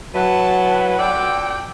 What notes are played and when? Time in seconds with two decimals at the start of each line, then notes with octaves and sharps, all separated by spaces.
0.15 E3 F#3 E4 B4 F#5 A5
1.00 F2 A4 D5 G5